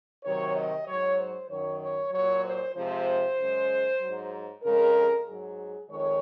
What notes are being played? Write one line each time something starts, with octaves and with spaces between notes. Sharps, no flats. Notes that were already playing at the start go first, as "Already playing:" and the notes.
C3 D#3 F#3 C#5
D#5
G#2 F#3 C#5
C5
F#2 D#3 F#3 C#5
C#5
A#2 F#3 C#5
C5
C3 F3 G#3 C5
F#2 C#3 G#3
G#2 F#3
F2 C#3 G#3 A#4
G#2 F#3 G#4
F2 D#3 G#3 C#5